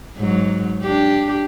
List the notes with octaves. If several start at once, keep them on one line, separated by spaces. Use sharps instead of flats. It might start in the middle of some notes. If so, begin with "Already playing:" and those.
G#2 F#3
D4 G4